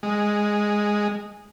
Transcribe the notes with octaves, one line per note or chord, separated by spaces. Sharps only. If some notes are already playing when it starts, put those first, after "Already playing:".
G#3